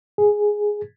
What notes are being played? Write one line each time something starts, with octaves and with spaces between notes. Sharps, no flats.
G#4